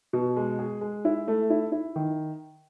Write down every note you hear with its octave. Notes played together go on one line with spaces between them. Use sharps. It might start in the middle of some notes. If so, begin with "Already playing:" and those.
B2
G#3
G#4
G#3
E4
A3
E4
E4
D#3